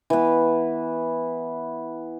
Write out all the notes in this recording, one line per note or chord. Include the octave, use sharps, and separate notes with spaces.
E3 B3